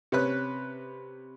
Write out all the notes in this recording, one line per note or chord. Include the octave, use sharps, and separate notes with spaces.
C3 C#4 B4 F#6